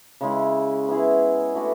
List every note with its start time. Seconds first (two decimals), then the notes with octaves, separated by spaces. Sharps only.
0.21 C#3 G#3 C#4 E4
0.88 B3 E4 G#4
1.55 A3 D4 F#4 B4